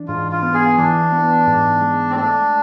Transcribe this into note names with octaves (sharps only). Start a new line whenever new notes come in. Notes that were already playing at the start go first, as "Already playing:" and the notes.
Already playing: E3 D4
G#2 F4
F4
B3
G#4
E3 D4
B3
G#2
G#3
C4
A3 D4